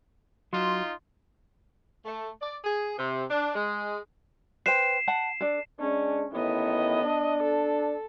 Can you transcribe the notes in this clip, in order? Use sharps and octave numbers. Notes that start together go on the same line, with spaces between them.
F#3 D#4 F4 C6
A3
D5
G#4
C3
D4
G#3
B4 C5 G5 C7 E7
F#5 A5
D4 A4
G#3 C#4 D4
A1 D#3 B3 E4 D#5
D4
A4